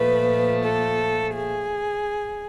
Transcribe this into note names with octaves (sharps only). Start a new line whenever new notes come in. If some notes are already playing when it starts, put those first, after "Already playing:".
Already playing: A#2 F3 A3 B4
A4
G#4